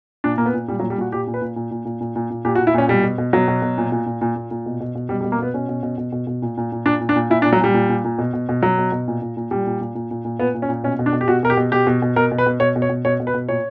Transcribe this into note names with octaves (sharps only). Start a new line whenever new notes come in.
A#2 D4
A#2 A#3
B3
A#2
A#2 G3
F#3
A#2
G3
A#2 F#4
A#2 G4
A#2
B4
A#2
A#2
A#2
A#2
A#2
A#2
A#2
A#2 G4
F#4
A#2
E4
A#2 C#4
B2 G3
B2
B2
B2 F#3
B2
B2
A#2
A#2
A#2
A#2
A#2
A#2
B2
B2
B2
B2 G3
G3
B2
A#3
B2 B3
B2 C#4
B2
B2
B2
B2
B2
A#2
A#2
A#2
A#2 D4
A#2
D4
A#2
A#2 E4
D4
A#2
F#3
A#2 G3
A#2
A#2
A#2
B2
B2
B2
B2 F#3
B2
B2
A#2
A#2
A#2
A#2 G3
A#2
A#2
A#2
A#2
A#2
A#2 B3
A#2
C#4
A#2
B2 C#4
B2
D4
B2
G4
B2 F#4
B2 A#4
G4
B2
B2 G4
B2
B2
B2 A#4
B2
B4
B2
B2 C#5
B2
C#5
B2
B2 C#5
B2
B4
B2
A#2 C#5